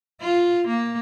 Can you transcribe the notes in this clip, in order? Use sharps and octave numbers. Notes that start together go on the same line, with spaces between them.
F4
A#3